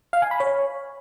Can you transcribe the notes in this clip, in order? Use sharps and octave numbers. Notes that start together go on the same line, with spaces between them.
F5
G#5
B5
C#5